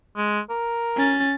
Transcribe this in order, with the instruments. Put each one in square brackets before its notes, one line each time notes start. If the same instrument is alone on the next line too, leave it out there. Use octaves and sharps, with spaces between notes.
[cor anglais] G#3
A#4
[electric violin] C#4 A6